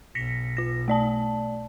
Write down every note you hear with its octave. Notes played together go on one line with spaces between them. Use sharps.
B1 A#6 B6 C#7
F4 A#6
A3 D5 A5